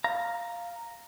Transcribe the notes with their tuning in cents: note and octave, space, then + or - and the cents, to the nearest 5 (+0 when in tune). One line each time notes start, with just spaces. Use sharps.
F5 +0 A#5 +0